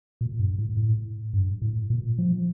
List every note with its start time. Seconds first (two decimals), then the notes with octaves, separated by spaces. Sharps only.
0.21 A#2
0.39 G2
0.59 A2
0.77 A2
1.33 G2
1.62 A2
1.90 A#2
2.18 F3